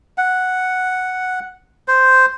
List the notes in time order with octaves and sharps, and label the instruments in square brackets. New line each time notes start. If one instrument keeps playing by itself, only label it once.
[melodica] F#5
C5